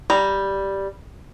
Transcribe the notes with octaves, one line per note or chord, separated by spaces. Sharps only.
G3 A#5